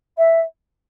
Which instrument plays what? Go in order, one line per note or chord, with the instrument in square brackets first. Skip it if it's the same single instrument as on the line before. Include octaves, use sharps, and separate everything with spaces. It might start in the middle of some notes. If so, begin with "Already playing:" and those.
[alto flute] E5